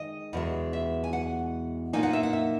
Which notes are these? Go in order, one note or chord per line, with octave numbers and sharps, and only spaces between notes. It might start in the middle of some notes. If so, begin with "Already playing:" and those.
Already playing: D#3 G#3 D#5
E2 B2 G#3
E5
G#5
F#5
A#2 A#3 D#4 G#5
F#5
E5
F#5
E5